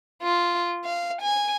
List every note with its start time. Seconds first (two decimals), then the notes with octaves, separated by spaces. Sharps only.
0.23 F4
0.84 F5
1.22 G#5